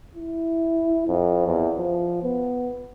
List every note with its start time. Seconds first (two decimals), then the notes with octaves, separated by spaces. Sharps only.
0.15 E4
1.07 F2
1.46 E2
1.78 F3
2.23 B3